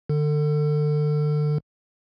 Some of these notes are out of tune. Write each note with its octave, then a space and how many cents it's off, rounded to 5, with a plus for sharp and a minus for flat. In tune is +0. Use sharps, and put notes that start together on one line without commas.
D3 +30 A4 +30